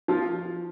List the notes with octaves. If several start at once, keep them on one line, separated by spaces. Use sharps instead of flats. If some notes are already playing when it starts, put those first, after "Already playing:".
F3 F4